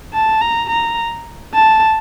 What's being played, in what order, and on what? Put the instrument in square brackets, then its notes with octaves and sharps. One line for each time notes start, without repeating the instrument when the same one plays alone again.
[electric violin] A5
A#5
A#5
A5